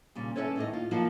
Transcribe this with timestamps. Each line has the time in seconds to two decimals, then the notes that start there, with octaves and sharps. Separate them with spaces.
0.15 A#2 C#3 G3
0.36 D2 C#4 E4 A4 B4 C#5
0.56 D#2 A2 D#4 D#5
0.73 F4
0.91 F3 F#3 A#3 D#4 F4 F#4